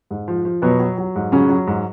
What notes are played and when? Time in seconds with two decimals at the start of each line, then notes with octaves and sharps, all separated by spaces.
0.11 G#2
0.28 F3
0.45 F3
0.62 B2 F#3 B3
0.80 F#3
0.98 F#3
1.16 G#2
1.32 C#3 F#3 C#4
1.49 F#3
1.67 G#2